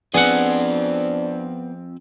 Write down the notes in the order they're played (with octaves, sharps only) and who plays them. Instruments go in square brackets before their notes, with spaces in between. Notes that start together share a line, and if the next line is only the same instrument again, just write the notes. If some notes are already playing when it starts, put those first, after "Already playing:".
[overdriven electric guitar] F3 C4 [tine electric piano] B3 [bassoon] D4 [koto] G#4 F#5